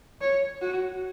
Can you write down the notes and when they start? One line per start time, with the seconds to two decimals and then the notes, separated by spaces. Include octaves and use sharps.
0.21 C#5
0.62 F#4